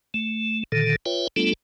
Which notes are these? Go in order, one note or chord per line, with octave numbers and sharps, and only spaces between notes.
A3
A#2 D3 D#3 A4
F4 B4 C#5 E5 G5
G3 A3 B3 D4 F4 A4